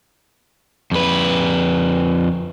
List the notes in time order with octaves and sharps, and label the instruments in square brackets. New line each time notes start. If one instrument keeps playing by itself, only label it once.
[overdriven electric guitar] F2 B4